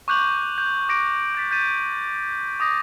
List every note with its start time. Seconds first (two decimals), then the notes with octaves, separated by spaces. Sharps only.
0.08 C#6 D6 F#6 G6 F7 F#7
0.58 G6
0.89 D6 A#6 D7
1.35 G6 A6 B6
1.51 G6 A6 B6 D#7
2.60 D6 D#6 A#6